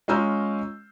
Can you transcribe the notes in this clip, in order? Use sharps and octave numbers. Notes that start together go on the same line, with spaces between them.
G#3 C#4 F4 A#5 E6 G6